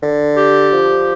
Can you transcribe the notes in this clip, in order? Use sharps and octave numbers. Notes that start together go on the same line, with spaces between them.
D3
G4
F3